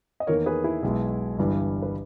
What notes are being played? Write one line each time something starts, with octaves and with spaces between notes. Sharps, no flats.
D#5
E2 D#3 A#3 A#4 C#5
G#4 B4
E4 G#4
B1 B2 G#3
G1 G2 E3 G3
B4